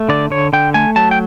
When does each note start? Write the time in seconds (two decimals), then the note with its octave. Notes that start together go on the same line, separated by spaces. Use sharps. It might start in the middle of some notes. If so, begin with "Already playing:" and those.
Already playing: A3
0.09 D3 D5
0.30 D3 C#5
0.53 D3 G5
0.74 A3 G#5
0.96 F#3 A5
1.11 G5